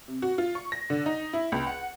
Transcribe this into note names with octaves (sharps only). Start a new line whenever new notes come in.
C3
F#4
F4
C#6
A#6
D3
D#4
E4
C#2
F#5